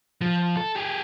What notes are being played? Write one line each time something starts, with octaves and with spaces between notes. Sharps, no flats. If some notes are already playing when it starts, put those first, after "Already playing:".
F3
A4
G4 G#4